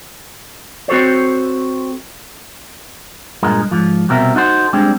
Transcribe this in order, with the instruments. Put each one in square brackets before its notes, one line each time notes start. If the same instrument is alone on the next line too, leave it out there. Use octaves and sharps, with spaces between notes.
[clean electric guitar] C4 F#4 A4 C5 C#5
G2 A#2 G#3 A#4
G#2 F3
C2 B2 C4 A#4 E5
D#4 F#4 A4 C5
G3 G#3 C4 D4